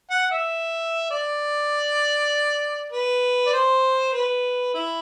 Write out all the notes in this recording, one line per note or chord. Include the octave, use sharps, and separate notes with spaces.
F#5
E5
D5
B4
D5
C5
B4
E4